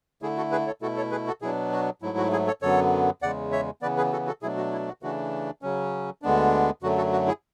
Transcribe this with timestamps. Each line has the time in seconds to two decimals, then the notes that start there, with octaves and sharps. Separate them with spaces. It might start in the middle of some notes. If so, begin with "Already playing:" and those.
0.22 D3 A3 E4 G#4
0.37 F#4 A4
0.52 G#4 B4
0.67 A4 C#5
0.82 B2 A3 E4 F#4 A4
0.97 A4 C#5
1.11 G#4 B4
1.27 F#4 A4
1.42 B2 F#3 B3 D4 E4 G#4
1.72 F#4
2.02 G#2 F#3 A3 E4
2.17 F#4
2.32 E4 G#4
2.47 A4 C#5
2.62 F#2 D3 F#3 B3 A4 C#5
3.22 E2 C#3 G#3 D5 F#5
3.52 C#5 E5
3.82 C#3 E3 B3 B4 D5
3.97 G#4 B4
4.12 F#4 A4
4.27 F#4 A4
4.42 B2 F#3 A3 D4 E4 G#4
4.57 F#4
4.72 E4
4.87 F#4
5.03 C#3 E3 A3 D4 F#4
5.62 C#3 F#3 C#4
6.22 D2 D3 G#3 B3 D4
6.83 F#2 D3 F#3 A3 F#4
6.97 F#4 A4
7.12 F#4
7.27 E4 G#4